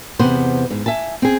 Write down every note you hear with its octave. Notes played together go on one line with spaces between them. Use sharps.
E2 C3 B3 C5 F#5
G#2
E5 G#5 A5
C4 G#4